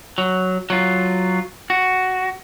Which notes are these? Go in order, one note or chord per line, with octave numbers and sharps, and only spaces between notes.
F#3
F#3 F4
F#4